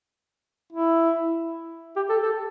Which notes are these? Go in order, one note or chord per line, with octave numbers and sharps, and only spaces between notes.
E4
G4
A4
A4